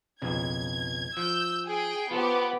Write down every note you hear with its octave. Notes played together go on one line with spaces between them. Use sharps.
B1 F2 C#3 G#6
F3 E6 G6
G#4 G5
B3 F4 G4 A4 C5